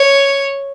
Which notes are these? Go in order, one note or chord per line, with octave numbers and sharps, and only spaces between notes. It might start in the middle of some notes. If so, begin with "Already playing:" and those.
Already playing: C#5